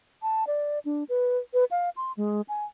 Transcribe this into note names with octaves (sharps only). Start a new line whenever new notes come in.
A5
D5
D4
B4
B4
F5
C6
G#3
G#5